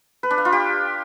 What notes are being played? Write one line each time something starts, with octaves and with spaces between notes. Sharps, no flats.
B4
D4
F5
F4
G4